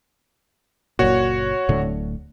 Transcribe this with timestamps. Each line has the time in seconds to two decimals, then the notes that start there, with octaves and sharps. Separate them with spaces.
0.99 F#1 A#2 F#4 C#5
1.69 D1 A2 D3